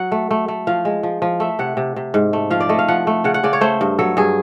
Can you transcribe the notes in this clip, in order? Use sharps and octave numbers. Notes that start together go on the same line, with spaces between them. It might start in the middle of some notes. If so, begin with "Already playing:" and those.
Already playing: F#3 F#5
A3
A3
A3
F3 F5
G#3
F3
F3
A3 E5
C3 F#5
C3
C3
G#2
A3
F3 F5
D5
A3 D#5
F5
F3 F#5
A3
C#3 F#5
F#5
C#3 D5
C#5
A3 C5
G2
F#3 A4
G2 G#4